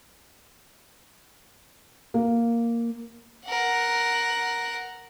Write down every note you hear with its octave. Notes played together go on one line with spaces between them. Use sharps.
A#3
A#4 F#5